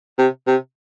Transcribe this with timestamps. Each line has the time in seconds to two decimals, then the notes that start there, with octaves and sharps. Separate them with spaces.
0.18 C3
0.47 C3